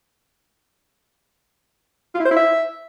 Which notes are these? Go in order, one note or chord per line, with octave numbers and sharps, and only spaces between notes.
F4
E4
C5
E4
E5